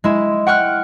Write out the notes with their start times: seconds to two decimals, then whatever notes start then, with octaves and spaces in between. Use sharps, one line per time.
0.04 G#3 E4
0.47 F#5 G5 C#6 F6 F#6